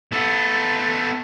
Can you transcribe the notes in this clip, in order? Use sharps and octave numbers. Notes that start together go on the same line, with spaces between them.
B3 A4